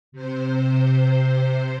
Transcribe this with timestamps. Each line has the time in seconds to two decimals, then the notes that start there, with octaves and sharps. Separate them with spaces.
0.12 C3 C5